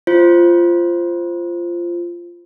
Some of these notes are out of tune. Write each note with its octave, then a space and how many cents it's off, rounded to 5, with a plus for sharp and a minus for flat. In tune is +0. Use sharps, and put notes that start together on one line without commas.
F4 -15 C5 +0